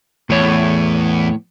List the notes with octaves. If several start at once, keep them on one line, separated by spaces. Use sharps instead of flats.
E2 A2 C#5